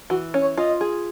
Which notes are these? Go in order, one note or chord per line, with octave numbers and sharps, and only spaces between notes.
E3 F#4
C#4
C#5
F4 D#5
G#4